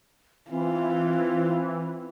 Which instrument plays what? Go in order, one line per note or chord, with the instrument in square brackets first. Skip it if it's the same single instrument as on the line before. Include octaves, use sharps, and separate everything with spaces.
[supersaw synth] E3 [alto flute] C4 [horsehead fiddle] F4